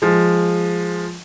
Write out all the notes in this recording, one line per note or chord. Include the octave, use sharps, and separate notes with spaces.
F3 G#3